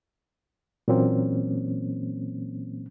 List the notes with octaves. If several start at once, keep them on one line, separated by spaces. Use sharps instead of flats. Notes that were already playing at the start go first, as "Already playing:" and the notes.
A#2 E3 F#3 A#3 C4 C#4